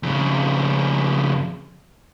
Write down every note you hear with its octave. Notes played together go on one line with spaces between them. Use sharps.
F2 C#3